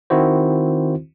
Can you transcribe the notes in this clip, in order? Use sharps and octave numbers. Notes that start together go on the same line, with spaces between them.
D#3 C4 E4 F#4 C5